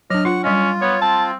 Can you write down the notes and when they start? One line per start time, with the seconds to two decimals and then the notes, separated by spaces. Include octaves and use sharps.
0.10 F#3 D4 D#5 F6
0.25 F4 F#5 C#6
0.44 G3 C#4 F4 D#5
0.82 B3 C#5
1.02 C4 A5